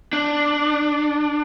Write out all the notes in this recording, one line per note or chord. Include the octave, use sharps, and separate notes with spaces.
D4